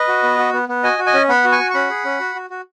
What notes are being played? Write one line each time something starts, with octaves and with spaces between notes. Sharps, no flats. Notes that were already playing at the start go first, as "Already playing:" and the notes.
Already playing: B4 D#5
F#4
B3
F#4
B3
B3
F#4 D#5 G#5
F#4
D#5 G#5
C#4
B3 F#5 B5
F#4
G#5 C#6
F#4
C#6
C#4 F#5 B5
G#4
C#4
F#4
F#4
F#4